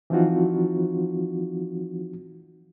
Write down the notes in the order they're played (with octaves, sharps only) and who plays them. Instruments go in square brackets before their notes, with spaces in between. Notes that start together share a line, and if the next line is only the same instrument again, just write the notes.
[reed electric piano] E3 F3 C4 D#4 F4 F#4